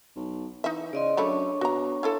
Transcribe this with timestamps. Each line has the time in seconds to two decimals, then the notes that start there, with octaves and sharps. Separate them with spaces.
0.16 B1
0.64 E3 D#4 E5
0.93 C#3 D5 D#5 C6
1.17 F#2 D3 A3 D4 C#5 B5 C#6
1.61 B2 F#4 A#5
2.03 E4 F4 A4